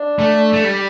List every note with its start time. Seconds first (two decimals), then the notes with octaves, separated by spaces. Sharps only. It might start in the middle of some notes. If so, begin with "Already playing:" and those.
Already playing: D4
0.19 A3
0.53 A3
0.64 G3